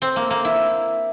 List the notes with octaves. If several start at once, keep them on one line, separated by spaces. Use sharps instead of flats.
C4
A#3
A#3
E4